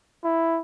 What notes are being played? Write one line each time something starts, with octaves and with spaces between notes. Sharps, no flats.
E4